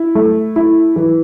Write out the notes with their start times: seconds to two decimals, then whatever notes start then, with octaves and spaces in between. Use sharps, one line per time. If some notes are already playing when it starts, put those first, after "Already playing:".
Already playing: E4
0.15 A3
0.56 E4
0.96 E3